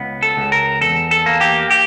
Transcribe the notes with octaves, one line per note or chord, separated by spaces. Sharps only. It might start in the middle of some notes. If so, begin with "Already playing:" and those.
Already playing: C#2 B3
A4
C#2
A#4
E2 A4
A4
A#3
G4
G4